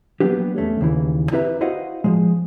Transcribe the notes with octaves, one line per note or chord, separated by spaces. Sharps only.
F#3 A#3 B3 D4 G4
E2 A3 C#4
D#2 C#3 E3
C4 E4 G4 B4 E5 A#5
E4 F#4 C5 D#5 F5 F#5
F3 F#3 G#3